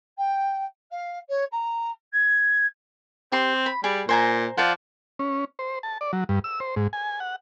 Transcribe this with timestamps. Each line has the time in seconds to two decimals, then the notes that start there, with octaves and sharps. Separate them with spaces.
0.17 G5
0.91 F5
1.29 C#5
1.51 A#5
2.13 G#6
3.32 C4 G4 C6
3.66 B5
3.84 G3 G#4
4.09 A#2 C5 G#5 A#5
4.57 F3 D5 F5 F#5
5.19 C#4
5.59 C5
5.83 A5
6.01 D5
6.13 F#3
6.29 G2
6.44 E6
6.60 C5
6.76 G#2
6.93 G#5
7.20 F#5